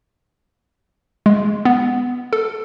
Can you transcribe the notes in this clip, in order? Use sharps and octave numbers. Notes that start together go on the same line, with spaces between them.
G#3
B3
A4